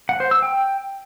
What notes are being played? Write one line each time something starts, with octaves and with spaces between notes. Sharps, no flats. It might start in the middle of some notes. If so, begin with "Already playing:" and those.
F#5
C5
E6
G5